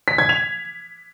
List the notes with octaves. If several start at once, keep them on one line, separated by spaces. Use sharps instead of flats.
B6
G#6
F7